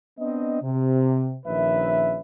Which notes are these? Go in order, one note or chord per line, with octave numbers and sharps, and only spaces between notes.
B3 C4 D4 D#5
C3
A#1 D#3 C#4 B4 E5